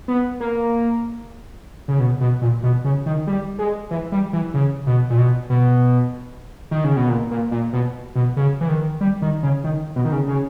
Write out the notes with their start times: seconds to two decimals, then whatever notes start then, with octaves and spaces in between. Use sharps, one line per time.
0.08 B3
0.40 A#3
1.88 C#3
1.99 B2
2.21 B2
2.42 A#2
2.63 B2
2.85 C#3
3.06 D#3
3.27 G3
3.59 G#3
3.91 E3
4.12 G3
4.33 E3
4.54 C#3
4.87 B2
5.10 A#2
5.18 B2
5.50 B2
6.71 D#3
6.84 C#3
6.96 B2
7.09 A#2
7.31 A#2
7.51 A#2
7.73 B2
8.15 B2
8.37 C#3
8.61 E3
8.68 D#3
9.01 G3
9.22 D#3
9.43 C#3
9.64 D#3
9.96 B2
10.05 D#3
10.12 C#3
10.28 C#3